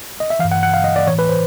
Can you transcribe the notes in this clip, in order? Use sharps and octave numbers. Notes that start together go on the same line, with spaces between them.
D#5
E5
E3 F5
G2
F#5
F#5
F5
D#5
D5
A2 E3 C#5
B4
C5